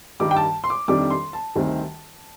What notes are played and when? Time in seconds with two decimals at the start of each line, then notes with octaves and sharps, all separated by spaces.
0.20 G2 D#3 G3 D6
0.31 G5
0.37 A5
0.64 C6
0.70 D6
0.88 F2 C3 D#3 G3 D4 D6
1.10 C6
1.33 A5
1.55 D2 C3 D#3 G3 C4